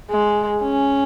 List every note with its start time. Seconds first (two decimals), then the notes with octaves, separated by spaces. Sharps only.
0.10 G#3
0.62 C#4